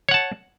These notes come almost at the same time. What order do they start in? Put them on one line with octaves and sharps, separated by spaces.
C#5 F#5 A5